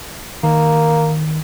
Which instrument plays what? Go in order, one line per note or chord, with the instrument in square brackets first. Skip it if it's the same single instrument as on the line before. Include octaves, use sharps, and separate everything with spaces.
[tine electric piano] D#3 [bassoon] A#3